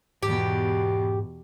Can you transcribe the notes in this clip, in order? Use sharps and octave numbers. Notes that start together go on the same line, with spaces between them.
E2 G#2 B2 G4